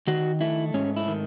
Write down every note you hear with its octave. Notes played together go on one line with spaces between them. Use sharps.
D#3 F#4
A3 E4
G#2 C#4
E4
D#3